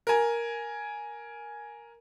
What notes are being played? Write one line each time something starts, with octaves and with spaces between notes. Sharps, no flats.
A#4 G#5